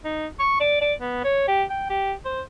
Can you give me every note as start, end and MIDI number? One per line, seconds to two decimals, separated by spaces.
0.05 0.27 63
0.40 0.56 85
0.61 0.80 74
0.81 0.94 74
1.01 1.21 59
1.24 1.44 73
1.48 1.63 67
1.70 1.90 79
1.90 2.13 67
2.25 2.42 72